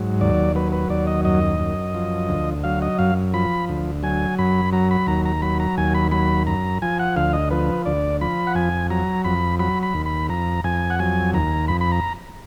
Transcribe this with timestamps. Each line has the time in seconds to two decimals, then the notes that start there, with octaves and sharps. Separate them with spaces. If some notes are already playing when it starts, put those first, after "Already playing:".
Already playing: G#2 F#3
0.21 D#2 D5
0.55 F#3 B4
0.72 B4
0.89 D#2 D5
1.07 D#5
1.25 F#2 D#5
1.60 F#2
1.94 F3
2.29 D2
2.64 F#3 F5
2.82 D#5
2.98 F#2 F5
3.34 F3 B5
3.69 D2
4.03 F#3 G#5
4.39 F#2 B5
4.72 F#3 A#5
4.91 B5
5.07 D#2 A#5
5.25 A#5
5.42 F#3 B5
5.60 A#5
5.77 D#2 G#5
5.95 B5
6.11 F#3 B5
6.47 F#2 A#5
6.82 F3 G#5
6.99 F#5
7.16 D2 F5
7.33 D#5
7.51 F3 B4
7.85 D2 D5
8.21 F3 B5
8.47 F#5
8.55 F2 G#5
8.90 F#3 A#5
9.25 F2 B5
9.59 F#3 B5
9.83 B5
9.94 D#2
10.06 B5
10.29 F2 A#5
10.64 F2 G#5
10.90 F#5
10.99 F#3 G#5
11.34 D#2 A#5
11.68 F2 B5
11.81 B5
11.92 A#5